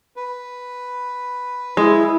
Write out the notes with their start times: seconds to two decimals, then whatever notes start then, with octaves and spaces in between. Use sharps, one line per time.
0.16 B4
1.77 G#3 E4